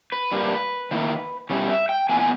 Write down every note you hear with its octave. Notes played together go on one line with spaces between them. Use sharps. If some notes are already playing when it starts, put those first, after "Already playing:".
B4
G2 G3 A#3
D#3 A#3 E4
B2 G3 C#4 E4
E5
G5
A#2 G#3 B3 E4 G#5
G#5